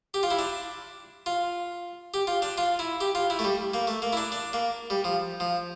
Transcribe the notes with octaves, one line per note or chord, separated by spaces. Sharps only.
G4
F4
E4
D4
F4
G4
F4
D4
F4
E4
G4
F4
E4
A3
G3
A#3
A3
A#3
E4
D4
D4
A#3
G3
F3
F3